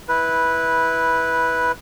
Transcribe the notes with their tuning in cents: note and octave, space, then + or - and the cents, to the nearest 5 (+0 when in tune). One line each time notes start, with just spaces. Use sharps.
E4 -15 B4 -5